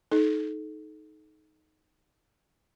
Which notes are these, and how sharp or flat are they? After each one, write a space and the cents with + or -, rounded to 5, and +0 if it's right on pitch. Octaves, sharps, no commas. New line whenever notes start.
D#4 +5 A4 -35